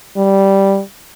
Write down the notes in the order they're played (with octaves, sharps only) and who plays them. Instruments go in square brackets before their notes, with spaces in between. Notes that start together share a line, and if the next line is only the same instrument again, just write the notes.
[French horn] G3